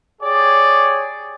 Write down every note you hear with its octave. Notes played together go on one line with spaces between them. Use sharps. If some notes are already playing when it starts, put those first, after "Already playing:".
G4 G#4 C#5 D5